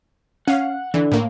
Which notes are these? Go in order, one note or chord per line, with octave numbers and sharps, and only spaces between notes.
C#4 F5 F#5
D3 E3
A2 A#3